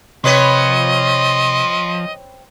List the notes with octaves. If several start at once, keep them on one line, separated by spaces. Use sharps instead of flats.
C3 F3 C4 B4 C#5 D#5